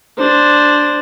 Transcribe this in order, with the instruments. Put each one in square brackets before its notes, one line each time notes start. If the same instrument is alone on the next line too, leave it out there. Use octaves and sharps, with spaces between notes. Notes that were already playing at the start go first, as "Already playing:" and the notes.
[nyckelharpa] D4 C5